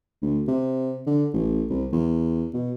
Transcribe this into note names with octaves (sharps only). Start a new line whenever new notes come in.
D2
C3
D3
A1
C2
E2
B2